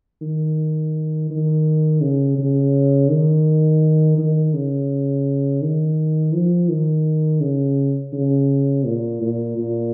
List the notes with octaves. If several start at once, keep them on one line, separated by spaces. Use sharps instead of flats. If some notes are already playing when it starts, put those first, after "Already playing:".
D#3
D#3
C#3
C#3
D#3
D#3
C#3
D#3
F3
D#3
C#3
C#3
A#2
A#2
A#2